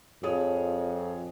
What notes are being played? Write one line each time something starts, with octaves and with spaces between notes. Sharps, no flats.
F2 G#4 C#5 D#6